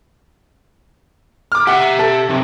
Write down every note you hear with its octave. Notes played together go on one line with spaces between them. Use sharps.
D6 F6
G4 E5 F#5
A4
C3 D#3